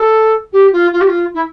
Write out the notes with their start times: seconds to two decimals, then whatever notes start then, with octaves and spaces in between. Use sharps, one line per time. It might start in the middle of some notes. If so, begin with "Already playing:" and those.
Already playing: A4
0.53 G4
0.73 F4
0.93 F4
1.01 G4
1.08 F4
1.34 E4